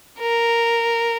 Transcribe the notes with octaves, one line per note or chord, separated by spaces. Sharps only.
A#4